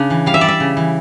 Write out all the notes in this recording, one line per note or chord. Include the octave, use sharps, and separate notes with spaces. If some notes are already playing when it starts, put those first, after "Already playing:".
Already playing: C#3 D4
E3
G3 F5
E5
G3 D5
E5
C#3
E3